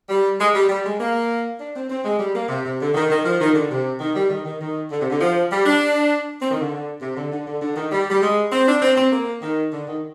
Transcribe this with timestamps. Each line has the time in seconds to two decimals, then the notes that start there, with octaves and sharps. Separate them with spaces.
0.09 G3
0.38 G#3
0.54 G3
0.69 G3
0.84 G#3
0.99 A#3
1.59 D4
1.74 C4
1.89 C4
2.04 G#3
2.19 G3
2.34 A#3
2.49 C3
2.64 C3
2.80 D3
2.94 D#3
3.09 D#3
3.25 F3
3.40 D#3
3.55 D3
3.70 C3
4.00 D#3
4.15 G3
4.30 D#3
4.45 D#3
4.60 D#3
4.90 D3
5.00 C3
5.10 D3
5.20 F3
5.51 G3
5.65 D4
6.41 C4
6.50 D#3
6.61 D3
7.01 C3
7.16 D3
7.31 D3
7.46 D3
7.61 D3
7.76 D#3
7.91 G3
8.10 G3
8.21 G#3
8.51 C4
8.67 D4
8.81 C4
8.96 C4
9.12 A#3
9.42 D#3
9.71 D3
9.87 D#3